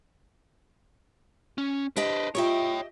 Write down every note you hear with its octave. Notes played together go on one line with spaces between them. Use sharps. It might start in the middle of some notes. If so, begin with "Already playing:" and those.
C#4
D4 G4 B4 C5 D#5
F4 G4 C#5 D#5 E5 G5 C#6